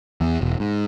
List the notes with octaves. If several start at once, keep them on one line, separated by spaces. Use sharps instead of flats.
E2
E1
G#2